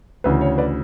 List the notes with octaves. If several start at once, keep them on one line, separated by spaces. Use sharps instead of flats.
D2 C#3 E3 B4
C#5
B4 D5